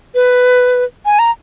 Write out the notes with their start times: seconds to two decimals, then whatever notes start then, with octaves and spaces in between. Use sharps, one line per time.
0.15 B4
1.06 G#5
1.19 A#5